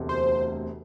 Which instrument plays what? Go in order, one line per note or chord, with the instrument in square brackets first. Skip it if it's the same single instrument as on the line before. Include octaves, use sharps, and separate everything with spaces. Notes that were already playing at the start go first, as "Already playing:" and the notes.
Already playing: [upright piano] E1 D2 C3
[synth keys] C5